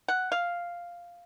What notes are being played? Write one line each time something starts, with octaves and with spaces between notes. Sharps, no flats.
F#5
F5